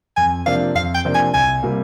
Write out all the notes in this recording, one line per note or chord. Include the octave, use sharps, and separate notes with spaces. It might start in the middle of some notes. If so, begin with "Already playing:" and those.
F2 G#5
C3 F3 A#3 D4 F5
F2 F5
G5
C3 F3 A#3 D4
G#5
C2 G#5
C3 G3 A#3